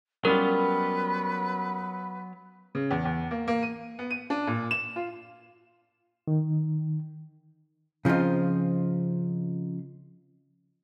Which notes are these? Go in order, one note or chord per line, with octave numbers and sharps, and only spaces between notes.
F#3 G3 B3 C#4 F4 G4 A#4 B4
C#3
E2
E2
A#3
A#3
D#7
B3
D#7
D4
A#2
E7
F4
D#3
C#3 F3 C4 D#4 F4